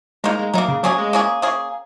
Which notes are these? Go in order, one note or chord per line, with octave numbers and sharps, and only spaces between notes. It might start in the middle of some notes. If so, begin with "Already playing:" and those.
G#3 A#3 D#4 A#4
G#3
F#3 A#3 D#4 A#4
C#3
F#3 A#3 C#4 G#4
G#3
A#3 C#4 G#4
A#3 C#4 G#4